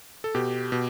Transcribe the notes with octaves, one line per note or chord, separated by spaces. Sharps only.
A4
B2 G4
B2